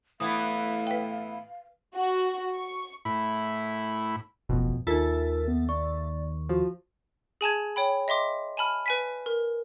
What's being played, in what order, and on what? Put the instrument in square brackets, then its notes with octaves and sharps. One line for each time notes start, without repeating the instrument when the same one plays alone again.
[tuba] A2 [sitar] E3 B3 E4 [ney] F5 [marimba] D#6
[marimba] B4 G5
[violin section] F#4
C#6
[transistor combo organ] A2 E4 B5
[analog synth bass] E1 [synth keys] A1 F2 B2
[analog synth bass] D#2 [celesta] D#4 F4 [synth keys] A4 E5 A6 [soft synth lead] A#4
[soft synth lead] B3
[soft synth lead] D5 [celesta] C#6
[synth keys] F3 [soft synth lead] F#4
[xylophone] G#4 G#5 A5 G#6
C#5 G5 B5
D#5 E5 C6 D6
G#5 A5 B5 F6
B4 G#5 B6
A#4